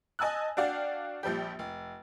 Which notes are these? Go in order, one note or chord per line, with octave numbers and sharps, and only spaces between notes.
D#5 G#5 A5 E6 F#6
D4 F#4 D5 F5 G5
A#1 F3 G3 G4
F1